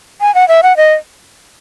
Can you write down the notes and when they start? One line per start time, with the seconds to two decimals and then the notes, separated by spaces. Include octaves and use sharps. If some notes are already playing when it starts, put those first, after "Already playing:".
0.21 G#5
0.35 F#5
0.48 E5
0.63 F#5
0.77 D#5